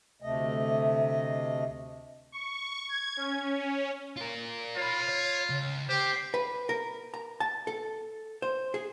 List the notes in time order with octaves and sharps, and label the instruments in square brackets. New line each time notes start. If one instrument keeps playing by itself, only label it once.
[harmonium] D2 C3 A3 D#5
[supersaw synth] C#6
G#6
C#4
C#4
[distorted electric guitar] F4 A#4
[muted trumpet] F4 [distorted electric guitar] C#5 B5
[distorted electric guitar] C#5
C#2
[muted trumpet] G4 [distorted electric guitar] C5 G5
[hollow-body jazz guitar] B4
A#4
A#5
A5
A4
C5
G#4